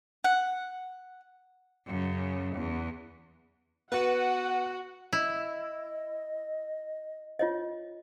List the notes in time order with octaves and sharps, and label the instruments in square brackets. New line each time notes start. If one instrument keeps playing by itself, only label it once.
[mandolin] F#5
[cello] F#2 C#3
E2
[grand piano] B3 [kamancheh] F#4 [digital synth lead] B4 [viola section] F#5
[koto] E4 [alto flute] D#5
[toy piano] F4 C#5 D#5